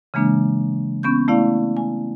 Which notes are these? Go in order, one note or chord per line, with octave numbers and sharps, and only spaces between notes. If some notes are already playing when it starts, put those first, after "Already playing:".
C#3 E3 G#3 A#3 D4
B3 C#4 C#6 G6
A3 B3 E4 D5 F5
G#5